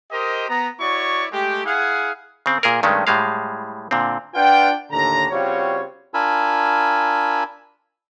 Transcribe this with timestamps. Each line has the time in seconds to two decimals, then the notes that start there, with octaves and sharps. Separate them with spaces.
0.11 G4 A#4 C5 D#5
0.49 B3 A#5
0.80 E4 F#4 C#5 D5 C#6
1.32 G#3 A3 G4
1.65 E4 G#4 F5 F#5 G#5
2.46 C#3 C4
2.63 A#2 G#4 A#4
2.83 G2 D#3 G#3 A3 C#4
3.07 A2 G3 G#3 F5
3.91 A#2 D3 C4
4.35 D4 F4 B4 F#5 G5
4.91 D#2 A2 D3 A#5
5.31 C#3 G3 C4 F4 F#4 C#5
6.14 D4 F4 A#4 G#5 B5 E6